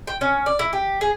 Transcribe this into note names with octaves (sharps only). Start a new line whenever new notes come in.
G5
C#4
D5
E4
G4
G#4